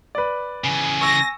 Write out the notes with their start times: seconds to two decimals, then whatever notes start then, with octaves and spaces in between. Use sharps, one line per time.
0.15 B4 D5
0.64 C#3 E3 G#5
1.01 C#6 E6 A#6